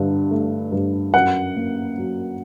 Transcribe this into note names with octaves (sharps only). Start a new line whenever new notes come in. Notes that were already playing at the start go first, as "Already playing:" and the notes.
Already playing: G2 D3
A3
G2
F#2 F#5
A#3
F#3